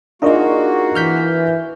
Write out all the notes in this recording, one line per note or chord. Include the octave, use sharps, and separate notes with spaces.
A#3 D4 D#4 F4 F#4 G#4 A#4 D#5
E3 F6 G6 B6